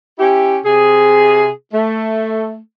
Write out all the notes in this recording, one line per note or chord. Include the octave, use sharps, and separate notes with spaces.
C#4 E4 G4
C3 G#4
A3